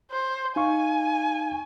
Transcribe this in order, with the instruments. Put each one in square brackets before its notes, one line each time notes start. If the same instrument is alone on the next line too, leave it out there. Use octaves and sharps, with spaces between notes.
[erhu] C5
[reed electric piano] D#4 F5 C#6 [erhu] G#5